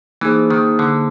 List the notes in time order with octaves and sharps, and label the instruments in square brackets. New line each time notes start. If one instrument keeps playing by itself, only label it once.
[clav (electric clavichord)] E3 [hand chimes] A#3 D#4 G#4 C5
[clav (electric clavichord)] D#3
D3